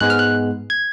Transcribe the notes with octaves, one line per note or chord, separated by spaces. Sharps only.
G#2 G#3 B3 F#6
F6
F#6
G#6